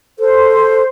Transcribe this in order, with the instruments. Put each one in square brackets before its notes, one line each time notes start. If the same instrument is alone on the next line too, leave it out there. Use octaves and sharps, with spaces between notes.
[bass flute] A4 [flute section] C5